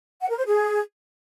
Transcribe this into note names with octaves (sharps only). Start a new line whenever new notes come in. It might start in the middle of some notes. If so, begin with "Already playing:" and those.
F#5
A#4
C5
G#4